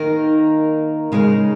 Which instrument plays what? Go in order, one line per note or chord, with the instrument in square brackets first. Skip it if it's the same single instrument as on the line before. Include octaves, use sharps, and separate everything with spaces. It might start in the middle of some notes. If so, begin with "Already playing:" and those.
Already playing: [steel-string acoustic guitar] D#3 A#3 D#4 A#4
C#3 G#3 D#4 A#4